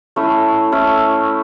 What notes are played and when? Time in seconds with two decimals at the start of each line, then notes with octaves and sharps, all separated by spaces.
0.16 A3 C#4 E4
0.72 A3 C#4 E4